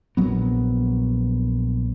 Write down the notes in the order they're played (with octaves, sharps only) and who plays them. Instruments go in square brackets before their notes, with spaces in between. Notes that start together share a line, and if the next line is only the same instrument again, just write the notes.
[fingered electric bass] A#1 F#3 B3